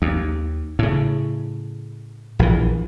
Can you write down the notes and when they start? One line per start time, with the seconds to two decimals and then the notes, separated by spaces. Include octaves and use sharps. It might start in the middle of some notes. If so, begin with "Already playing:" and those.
0.02 D#2
0.79 A2 C#3
2.39 A#1 E3